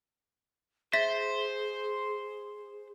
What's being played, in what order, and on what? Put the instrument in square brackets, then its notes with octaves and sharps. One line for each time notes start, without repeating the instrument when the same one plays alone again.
[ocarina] G#4 [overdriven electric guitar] C5 [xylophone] E5 A#6 B6